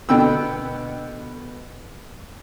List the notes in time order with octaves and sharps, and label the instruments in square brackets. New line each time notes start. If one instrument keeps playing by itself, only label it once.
[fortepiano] B2 D3 B3 G5 B5 E6